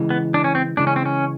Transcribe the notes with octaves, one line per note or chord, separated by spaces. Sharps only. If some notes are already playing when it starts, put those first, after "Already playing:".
Already playing: C#3 E3 G#3
B3
D4
C#4
C4
C#3 E3 G#3 D4
C#4
C4
C#4